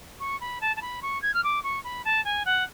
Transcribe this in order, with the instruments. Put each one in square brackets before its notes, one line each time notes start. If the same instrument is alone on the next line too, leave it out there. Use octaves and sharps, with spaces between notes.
[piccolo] C#6
B5
A5
A5
B5
C#6
G#6
F6
D6
C#6
B5
A5
G#5
F#5